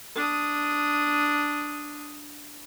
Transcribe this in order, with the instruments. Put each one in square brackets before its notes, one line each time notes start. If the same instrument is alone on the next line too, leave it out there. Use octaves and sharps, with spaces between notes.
[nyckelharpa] D4 D#6